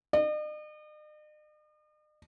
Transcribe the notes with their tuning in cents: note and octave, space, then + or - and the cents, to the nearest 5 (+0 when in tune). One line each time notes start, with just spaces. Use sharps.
D#5 -45